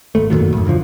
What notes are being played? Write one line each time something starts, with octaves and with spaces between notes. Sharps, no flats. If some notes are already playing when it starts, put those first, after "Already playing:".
G#1 A3
F#2 A#2 D#3 F#3
A1 F#2
B1 F#2 D3 F3